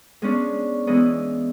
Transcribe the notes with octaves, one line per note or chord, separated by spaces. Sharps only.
G#3 B3 C#4 D4
E3 G#3 B3